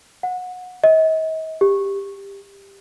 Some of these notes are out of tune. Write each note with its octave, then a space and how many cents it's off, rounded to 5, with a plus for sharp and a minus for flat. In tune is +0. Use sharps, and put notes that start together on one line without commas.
F#5 -25
D#5 +40
G4 +15